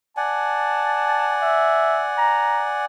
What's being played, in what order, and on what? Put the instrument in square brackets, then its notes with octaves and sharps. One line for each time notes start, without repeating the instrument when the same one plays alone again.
[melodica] D5 F#5 G#5 [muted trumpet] A5
[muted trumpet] E5
A#5